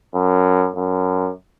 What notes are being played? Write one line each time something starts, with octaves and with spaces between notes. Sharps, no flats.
F#2
F#2